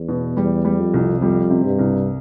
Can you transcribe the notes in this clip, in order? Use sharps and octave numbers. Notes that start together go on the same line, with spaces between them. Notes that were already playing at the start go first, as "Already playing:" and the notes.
Already playing: E2
B2
E2 G3
G3
F2
C2
F2 G3
C3
G2
C2